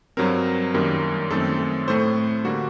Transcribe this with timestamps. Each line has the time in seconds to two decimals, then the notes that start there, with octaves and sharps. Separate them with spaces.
0.17 G2 F#3 C4 A#4
0.74 F#2 D#3 G3 A#3
1.30 F#2 D#3 A3 C4 A4
1.88 A2 A3 C4 C5
2.45 D3 G3 A#3 F#4